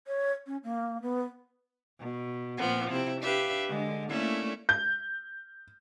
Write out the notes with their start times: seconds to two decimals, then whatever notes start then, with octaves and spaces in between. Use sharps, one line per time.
0.07 C#5
0.47 C#4
0.64 A#3
1.02 B3
1.98 B2
2.57 A#2 F3 B3 C4
2.91 C3 C4 E4
3.21 D4 G4 B4 E5 F5
3.68 D3 G#3
4.08 A3 A#3 C#4 D4 E4
4.69 G6